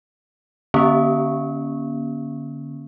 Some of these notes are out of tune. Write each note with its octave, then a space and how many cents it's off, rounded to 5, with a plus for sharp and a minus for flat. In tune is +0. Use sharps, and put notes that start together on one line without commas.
D3 +0 A#3 +45 C#4 +10